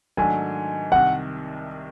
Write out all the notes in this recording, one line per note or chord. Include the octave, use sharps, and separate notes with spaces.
G#2 D#3 F#3 A3 D4 G#5
C2 C3 D#3 F#5